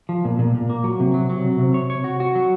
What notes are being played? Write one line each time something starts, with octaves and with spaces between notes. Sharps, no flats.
F3
A#2
A#2
A#2
A#3
F#3
C3
F#3
F#3
C3
C3
C#5
C#5
F#4
F#4
F#3